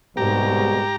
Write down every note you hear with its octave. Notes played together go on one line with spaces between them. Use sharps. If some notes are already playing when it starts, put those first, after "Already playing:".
C2 G#2 B2 G#3 G4 A#5